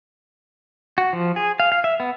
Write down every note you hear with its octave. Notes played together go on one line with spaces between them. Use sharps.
F#4
F3
G#4
F5
F5
E5
B3